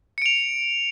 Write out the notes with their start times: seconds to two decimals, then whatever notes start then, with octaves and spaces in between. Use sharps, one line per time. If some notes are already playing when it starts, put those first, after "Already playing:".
0.18 C#7
0.22 D7
0.26 F7